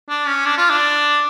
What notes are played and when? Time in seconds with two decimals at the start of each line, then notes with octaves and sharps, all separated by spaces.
0.09 D4
0.27 C#4
0.46 D4
0.58 F4
0.70 D4